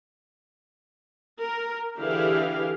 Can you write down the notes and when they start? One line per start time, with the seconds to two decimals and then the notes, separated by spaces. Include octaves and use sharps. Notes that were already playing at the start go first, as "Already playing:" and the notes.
1.40 A#4
1.97 D3 E3 E4 G4 G#4 F5